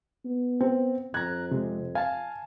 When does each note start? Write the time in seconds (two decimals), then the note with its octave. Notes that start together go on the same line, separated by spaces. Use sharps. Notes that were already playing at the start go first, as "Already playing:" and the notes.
0.25 B3
0.61 C4
1.14 F2 A#5 F#6 G#6
1.51 C3 G#3
1.95 F5 G#5 A5